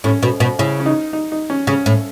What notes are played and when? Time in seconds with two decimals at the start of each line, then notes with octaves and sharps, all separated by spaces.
0.04 A2 C#4
0.23 B2
0.40 B2
0.59 C#3 E4
0.80 C#4
0.86 D#4
1.13 D#4
1.32 D#4
1.50 C#4
1.67 C#3 C#4
1.86 A2